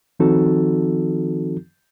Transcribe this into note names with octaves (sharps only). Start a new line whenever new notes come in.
D#3 F3 C4 D#4 F#4 A4